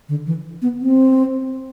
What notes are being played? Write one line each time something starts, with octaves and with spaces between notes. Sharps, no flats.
D3
E3
B3
C4